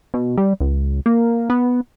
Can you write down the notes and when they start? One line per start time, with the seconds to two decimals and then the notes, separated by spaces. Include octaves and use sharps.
0.14 B2
0.38 G3
0.60 C#2
1.06 A#3
1.50 B3